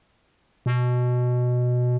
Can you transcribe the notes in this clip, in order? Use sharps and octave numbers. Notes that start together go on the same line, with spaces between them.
B2